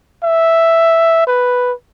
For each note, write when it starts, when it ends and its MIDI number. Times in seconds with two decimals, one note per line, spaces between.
0.23 1.22 76
1.27 1.72 71